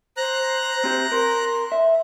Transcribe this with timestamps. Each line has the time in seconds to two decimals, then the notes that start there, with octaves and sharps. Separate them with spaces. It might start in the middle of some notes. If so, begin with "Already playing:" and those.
0.17 C5 A#5 F#6
0.84 C4 G4
1.12 A#4 C6
1.72 E5